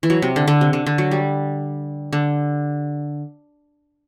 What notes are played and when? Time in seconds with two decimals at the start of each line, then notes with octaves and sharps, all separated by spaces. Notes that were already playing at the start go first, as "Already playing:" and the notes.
0.03 E3
0.10 F#3
0.22 C3
0.36 D3
0.48 D3
0.61 C3
0.73 D3
0.86 D3
0.98 F#3
1.11 G3
2.13 D3